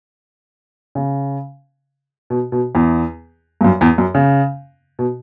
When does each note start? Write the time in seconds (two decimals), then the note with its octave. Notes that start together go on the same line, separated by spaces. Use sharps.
0.95 C#3
2.30 B2
2.52 B2
2.75 E2
3.61 G2
3.64 F#2
3.81 E2
3.98 F#2
4.15 C#3
4.99 B2